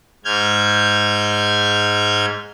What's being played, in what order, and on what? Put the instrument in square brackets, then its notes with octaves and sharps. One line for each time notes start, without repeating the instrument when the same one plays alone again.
[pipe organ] G#2 F6 G6 G#6